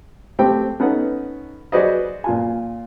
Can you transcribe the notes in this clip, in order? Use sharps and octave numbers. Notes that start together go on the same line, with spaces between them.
A3 C4 G4 G5
B3 C#4 D#4 A4 F#5
F#4 G#4 B4 C5 D5 D#5
A#2 F4 G#5